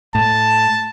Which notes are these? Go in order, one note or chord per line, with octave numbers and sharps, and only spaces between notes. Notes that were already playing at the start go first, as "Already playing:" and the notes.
A2 A5